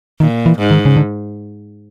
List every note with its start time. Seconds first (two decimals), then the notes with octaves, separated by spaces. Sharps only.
0.20 A#2 D#3
0.46 E3
0.59 G#2
0.71 D#3
0.85 C#3
0.97 D3